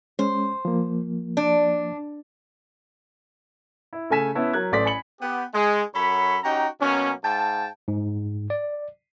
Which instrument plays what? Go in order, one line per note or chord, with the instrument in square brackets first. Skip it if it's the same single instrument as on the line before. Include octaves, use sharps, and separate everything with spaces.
[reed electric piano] G#3 C#4 [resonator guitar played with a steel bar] C5
[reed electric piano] F3 A#3
[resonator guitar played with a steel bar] D4
[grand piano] E4
C#3 A3 A4 G#5 B6 E7
B3 C#4 E4 A5
F#3 A#4 F#6 G#6
A1 A3 D5 C6 B6
G#5 B5 C#7 F#7
[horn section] B3 G4
G#3
F#2 F#3 A4 C#5 B5
C#4 D#4 F#4 G4 G5 A#5
B2 F#3 A#3 C#4
G#2 F5 G5 A5
[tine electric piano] G#2
D5